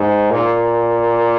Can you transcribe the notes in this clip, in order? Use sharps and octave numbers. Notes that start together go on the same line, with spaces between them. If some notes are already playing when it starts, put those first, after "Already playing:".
Already playing: G#2
A#2